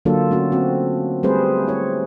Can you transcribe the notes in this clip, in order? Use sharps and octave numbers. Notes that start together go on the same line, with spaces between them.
D3 F#3 A#3 D4 F4 A4
A3 C#4 F#4
C4 F#4
G3 A3 C4 G#4 B4 C5
E4 C#5